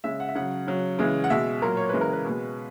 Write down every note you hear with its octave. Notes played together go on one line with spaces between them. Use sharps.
C#3 G#3 E5
F#5
E5
C#3 F#3 F#5
C#3 F#3
C#3 E3 G#3
F#5
B2 G#3 E5
A#2 F#3 A#4
C#5
C#3 E3 G#3 B4
A#4
B4
B2 G#3